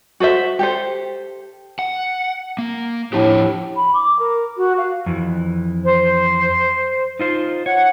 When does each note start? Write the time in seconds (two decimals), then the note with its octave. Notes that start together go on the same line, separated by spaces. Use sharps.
0.20 F#4 A4 C5 E5
0.59 G4 A4 C5
1.79 F#5
2.59 A#3
3.13 A2 F3 D4 G4
3.76 B5
3.93 D6
4.19 A#4
4.57 F#4
4.77 F5
5.06 F2 E3
5.83 C5
7.19 D#4 F4 C5
7.66 C#5 F#5